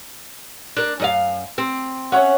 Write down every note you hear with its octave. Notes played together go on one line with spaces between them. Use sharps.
D4 A#4
F#2 D#5 F5
C4
C#4 C#5 E5 F#5